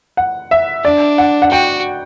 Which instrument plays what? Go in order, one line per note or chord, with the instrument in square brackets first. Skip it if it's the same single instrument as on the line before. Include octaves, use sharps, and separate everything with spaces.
[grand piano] F#5
E5
[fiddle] D4 [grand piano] D5
[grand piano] F#5
F#5
[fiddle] F#4 [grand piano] G5